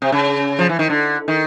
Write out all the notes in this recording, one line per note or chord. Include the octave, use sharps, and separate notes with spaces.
C3
C#3
F3
E3
D#3
D3
D#3